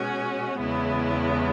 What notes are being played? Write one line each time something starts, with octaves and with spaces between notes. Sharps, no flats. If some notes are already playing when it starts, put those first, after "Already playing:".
Already playing: B2 G#3 C#4 F#4
E2 C#3 G#3 B3 E4